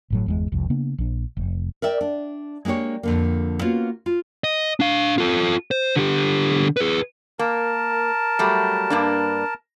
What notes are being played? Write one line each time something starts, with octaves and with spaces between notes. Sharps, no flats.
G1 A2 F#3
G1 E2 G#3
F1 C2 F2
C#3 A#3 B3 D4
A#1 D4
F1
A#4 D5 E5 G5
D4
G#3 A#3 D4 G4 C#5
F2 D3 A#3
A#3 B3 C#4 F4 F#4
F4
D#5
D4 F5
F4 A4
C5
D3 G4
G#4 B4
A#3 A#4 A5
F#3 G3 A3
G2 A#3 D4